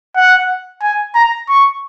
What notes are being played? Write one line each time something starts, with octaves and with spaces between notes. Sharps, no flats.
F#5
G#5
A#5
C#6